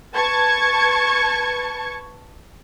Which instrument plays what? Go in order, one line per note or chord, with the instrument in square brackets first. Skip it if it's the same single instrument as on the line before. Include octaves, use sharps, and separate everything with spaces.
[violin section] B4 A5 C#6 G#6 C#7